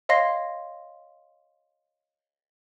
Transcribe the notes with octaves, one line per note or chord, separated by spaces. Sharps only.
C#5 D#5 F5 C6 A#6 C7